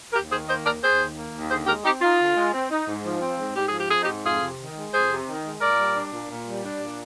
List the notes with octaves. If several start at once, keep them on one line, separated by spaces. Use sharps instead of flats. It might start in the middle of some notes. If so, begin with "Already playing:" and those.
D#2 G4 A#4
D#3 G#4 C5
A#3 C5 D#5
D#2 A#4 D5
D#2 G#4 C5
D#3
A#3
D#2
D3 G#4 C5
G#3 G4 A#4
C4 D#4 G4
D#4 F4
D3
G#3
C4
D#4
G#2
F3
C4
G#2
G#2 G4
G#4
F3
G4
C4 G#4
D#4 G4
G#2
F2 F4 G#4
C3
D#3
G#3
F2 G#4 C5
C3
D#3
G#3
A#2 A#4 D5
G3
D4
A#2
A#2
G3
D4
A#2